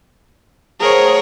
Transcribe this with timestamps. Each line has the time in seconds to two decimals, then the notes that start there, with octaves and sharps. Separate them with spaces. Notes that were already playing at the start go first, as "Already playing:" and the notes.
0.80 F3 F#3 A3 G#4 A#4 C#5